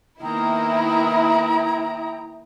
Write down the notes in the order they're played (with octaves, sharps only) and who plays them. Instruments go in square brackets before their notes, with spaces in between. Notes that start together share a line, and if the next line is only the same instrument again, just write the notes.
[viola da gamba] D#3 A#3 B3 [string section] E4 [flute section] G5 A#5 D#6